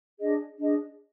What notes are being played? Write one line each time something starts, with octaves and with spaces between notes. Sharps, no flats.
D4 G#4 D#5
D4 G#4 D#5